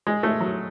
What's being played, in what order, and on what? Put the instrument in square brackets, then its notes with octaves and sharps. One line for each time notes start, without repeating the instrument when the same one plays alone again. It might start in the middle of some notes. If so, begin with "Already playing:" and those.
[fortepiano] G#3
A3
F#3